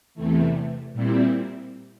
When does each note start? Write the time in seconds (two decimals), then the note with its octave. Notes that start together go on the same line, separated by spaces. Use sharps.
0.15 E2 C3 E3 A3
0.93 A#2 G3 C4 E4